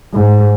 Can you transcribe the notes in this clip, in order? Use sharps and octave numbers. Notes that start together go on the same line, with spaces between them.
G#2